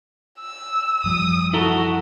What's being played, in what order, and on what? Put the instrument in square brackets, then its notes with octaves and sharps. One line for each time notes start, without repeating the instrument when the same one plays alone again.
[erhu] E6
[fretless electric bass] F#2 F3 G3 [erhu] D#6
[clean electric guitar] E4 A4 A#5 [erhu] F#4